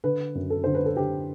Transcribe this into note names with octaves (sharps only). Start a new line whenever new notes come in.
D3 B4
F#2
A4
D3 C5
B4
A4
D3 G4